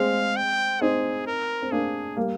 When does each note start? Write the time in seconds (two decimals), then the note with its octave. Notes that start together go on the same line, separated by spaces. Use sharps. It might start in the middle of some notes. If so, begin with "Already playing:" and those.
Already playing: G#3 C4 F5
0.36 G5
0.81 C4 D#4 G#4
1.27 A#4
1.62 C4
1.71 A#3 D4 G#4
2.17 G3 A#3